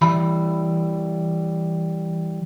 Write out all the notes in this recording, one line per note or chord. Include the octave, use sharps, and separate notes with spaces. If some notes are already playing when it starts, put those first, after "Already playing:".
E3 G3 B5